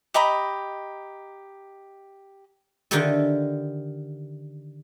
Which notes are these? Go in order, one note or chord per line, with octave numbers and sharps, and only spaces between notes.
G4 D#5 A#5 B5
D3 D#3 D#4 E4 G4 A4